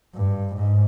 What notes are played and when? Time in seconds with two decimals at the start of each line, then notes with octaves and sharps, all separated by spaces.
0.15 G2
0.56 G#2